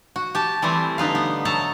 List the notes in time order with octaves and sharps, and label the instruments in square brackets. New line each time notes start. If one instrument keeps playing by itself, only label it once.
[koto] F#4
G4 A5
E3 G3 A3 C4
D3 D#4 B4 F5
B3
F#3 A4 A5 A#5